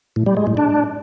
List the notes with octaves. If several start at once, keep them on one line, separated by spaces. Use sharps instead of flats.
A2
G3
G#3
A2
D4